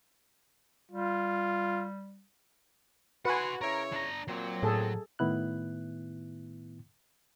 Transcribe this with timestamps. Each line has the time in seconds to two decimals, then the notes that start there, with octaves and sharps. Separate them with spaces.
0.91 G3 F4
3.25 F#4 B4 F#5 G#5 C6
3.61 C#3 E4 A#4 C#5
3.93 D4 A#5
4.28 A#2 F#3 C4
4.63 A2 G#4 A4
5.19 A2 D#3 B3 E4 F#6